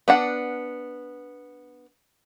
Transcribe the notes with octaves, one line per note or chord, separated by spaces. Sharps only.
B3 D4 F#5